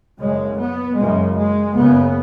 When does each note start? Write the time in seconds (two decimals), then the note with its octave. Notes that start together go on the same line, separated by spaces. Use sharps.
0.20 F#1 F#2 C#3 G#3
0.59 B3
0.98 F#1 F#2 C#3 G#3
1.37 G#3
1.75 F#1 F#2 C#3 B3